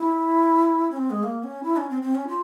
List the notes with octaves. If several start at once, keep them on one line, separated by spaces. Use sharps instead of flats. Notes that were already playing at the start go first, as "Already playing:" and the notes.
Already playing: E4
C#4
C4
G#3
A#3
C#4
E4
C#4
C4
C4
C#4
F4